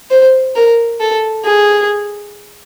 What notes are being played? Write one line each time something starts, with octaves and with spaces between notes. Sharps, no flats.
C5
A#4
A4
G#4